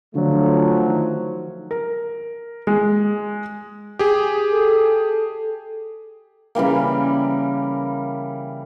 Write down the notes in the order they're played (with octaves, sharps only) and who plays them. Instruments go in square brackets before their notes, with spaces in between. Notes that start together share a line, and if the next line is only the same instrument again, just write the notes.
[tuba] D3 [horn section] F3 F#3 A3
[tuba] D#3
[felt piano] A#4
G#3
[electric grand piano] G4 G#4
[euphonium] A4
[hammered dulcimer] C#3 E3 G3 A#3